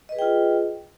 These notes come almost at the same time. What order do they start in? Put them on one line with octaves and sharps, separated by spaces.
D#5 B4 G#4 G5 F4